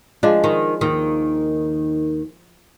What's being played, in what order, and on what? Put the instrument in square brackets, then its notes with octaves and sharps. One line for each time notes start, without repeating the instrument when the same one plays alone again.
[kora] F3 G#3 [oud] D4
[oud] D#3
D#2 D#3